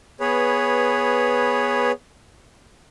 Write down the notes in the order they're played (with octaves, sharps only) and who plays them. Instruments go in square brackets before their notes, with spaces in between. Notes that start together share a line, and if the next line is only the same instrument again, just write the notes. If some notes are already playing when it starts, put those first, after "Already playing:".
[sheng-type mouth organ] B3 G#4 B4 C#5